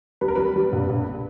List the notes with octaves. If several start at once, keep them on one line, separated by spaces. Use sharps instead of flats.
G3 B4
A#4
G3 B4
G3
A#1
A#1